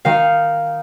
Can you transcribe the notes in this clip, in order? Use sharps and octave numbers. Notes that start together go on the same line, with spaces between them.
D#3 F5